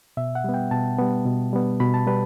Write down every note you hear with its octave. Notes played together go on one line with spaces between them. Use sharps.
B2 E5
F#5
G3 B3
G5
B2 A5
G3 B3
B2
G3 B3
B2 B5
A5
G3 B4